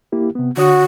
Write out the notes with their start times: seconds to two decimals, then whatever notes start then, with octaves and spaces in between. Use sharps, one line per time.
0.12 A#3 E4 G4
0.35 C3 B3
0.57 D3 F#4 C#5 D#6